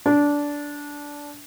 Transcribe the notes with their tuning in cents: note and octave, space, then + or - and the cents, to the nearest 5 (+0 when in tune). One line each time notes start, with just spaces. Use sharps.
D4 -15